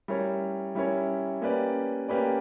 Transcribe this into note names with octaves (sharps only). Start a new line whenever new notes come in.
G3 C#4 E4 A#4 C#5
G3 C#4 E4 A#4 C#5
A#3 C#4 G4 B4 D5
A#3 C#4 G4 B4 D5